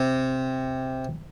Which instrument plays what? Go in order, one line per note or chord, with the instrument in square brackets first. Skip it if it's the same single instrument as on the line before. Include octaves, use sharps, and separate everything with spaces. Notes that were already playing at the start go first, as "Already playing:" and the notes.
Already playing: [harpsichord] C3